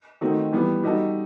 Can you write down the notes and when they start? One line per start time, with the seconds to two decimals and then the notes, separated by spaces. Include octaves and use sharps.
0.21 D#3 A3 C4 D#4 F#4
0.52 E3 G3 B3
0.83 G3 D#4 F#4 A4